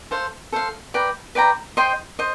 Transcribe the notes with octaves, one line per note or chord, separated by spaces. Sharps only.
A4 C5 F5
A4 C5 F5
B4 D5 G5 A#5
B4 D5 G5 A#5
C5 D#5 G5 C6
C5 D#5